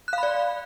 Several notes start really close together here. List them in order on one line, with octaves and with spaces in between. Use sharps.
F#6 F5 B5 D5